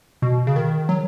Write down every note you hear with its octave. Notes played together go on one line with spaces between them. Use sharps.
B2
C#3
D#3
F#3